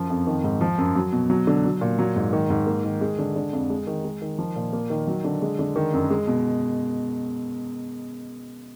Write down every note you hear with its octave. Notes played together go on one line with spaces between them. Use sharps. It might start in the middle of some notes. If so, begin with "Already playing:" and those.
Already playing: F#2 F3
F2
D#3
G#2
F3
F#2
F#3
B2
F#3
D3
F#3
A#2
F#3
G#2
D#3
G#2
A#3
D#3
G#3
D3
D3
F2
G#3
D#3
G#3
D#3
F3
A#2
A#3
D#3
F#3
D3
G#3
D3
D#3
F#2
G#3
B2